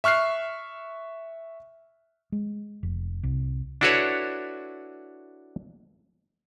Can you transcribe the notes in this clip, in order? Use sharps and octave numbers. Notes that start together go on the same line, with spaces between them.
E5 C#6 F6 F#6 C7
G#3
F1
C2
D4 E4 F#4 A4 B4 C#5